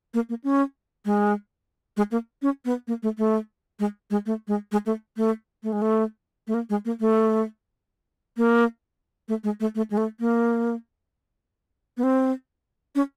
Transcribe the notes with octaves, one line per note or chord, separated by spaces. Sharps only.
A#3
A#3
C#4
G#3
G#3
A#3
C#4
B3
A#3
A3
A3
G#3
G#3
A3
G#3
G#3
A3
A3
A3
G#3
A3
A3
A#3
G#3
A#3
A3
A#3
A3
G#3
A3
A3
G#3
A3
A#3
B3
C4
C#4